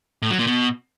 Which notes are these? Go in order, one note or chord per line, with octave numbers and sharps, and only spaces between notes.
A2
F#3
A#2
B2